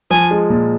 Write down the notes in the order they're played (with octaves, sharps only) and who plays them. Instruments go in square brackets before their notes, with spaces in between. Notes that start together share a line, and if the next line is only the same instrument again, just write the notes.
[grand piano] F3 [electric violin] G#5
[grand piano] G#3
A#2